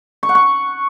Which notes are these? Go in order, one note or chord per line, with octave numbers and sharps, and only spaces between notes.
C#6
F#5
C#6